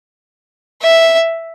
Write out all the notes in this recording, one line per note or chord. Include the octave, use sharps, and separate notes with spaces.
E5